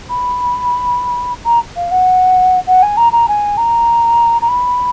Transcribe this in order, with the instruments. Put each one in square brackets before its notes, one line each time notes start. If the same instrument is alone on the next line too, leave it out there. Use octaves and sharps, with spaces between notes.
[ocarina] B5
A#5
F5
F#5
F#5
G#5
A#5
A#5
G#5
A#5
A#5
B5